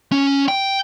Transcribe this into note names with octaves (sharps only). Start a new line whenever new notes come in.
C#4
G5